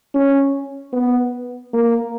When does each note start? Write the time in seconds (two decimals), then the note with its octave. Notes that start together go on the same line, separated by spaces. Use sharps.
0.14 C#4
0.93 B3
1.73 A#3